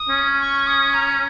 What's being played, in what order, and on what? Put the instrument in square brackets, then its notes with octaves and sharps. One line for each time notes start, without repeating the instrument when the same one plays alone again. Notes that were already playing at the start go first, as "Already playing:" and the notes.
Already playing: [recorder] D#6
[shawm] C#4
[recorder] C#6
D#6
A#5